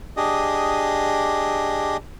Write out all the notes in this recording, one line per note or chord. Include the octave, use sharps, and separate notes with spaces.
D4 G4 G#4 D#5